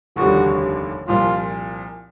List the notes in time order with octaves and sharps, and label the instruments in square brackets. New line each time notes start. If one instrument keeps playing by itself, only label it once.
[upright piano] F1 D#2 D3 G3 [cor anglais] F#4
[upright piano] C2 A#2 F3 [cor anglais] F4